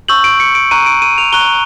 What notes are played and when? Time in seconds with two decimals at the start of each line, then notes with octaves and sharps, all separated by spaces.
0.08 C#6 E6 G6 F#7
0.24 D7
0.40 C#7
0.55 D7
0.71 A#5 C#6 F#6 D#7
0.86 D7
1.02 D#7
1.18 F7
1.33 A#5 C#6 F#6 G7